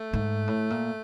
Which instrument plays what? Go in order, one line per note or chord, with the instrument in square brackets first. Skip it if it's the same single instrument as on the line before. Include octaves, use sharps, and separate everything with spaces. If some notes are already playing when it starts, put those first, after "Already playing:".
Already playing: [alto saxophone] A3
[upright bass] G#2
A2
A#2